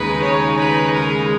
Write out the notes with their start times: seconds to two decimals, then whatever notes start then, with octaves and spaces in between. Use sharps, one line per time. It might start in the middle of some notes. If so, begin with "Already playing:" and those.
Already playing: D#2 C#3 G#3 D#4 B4
0.24 C#5
0.59 B4
0.95 A#4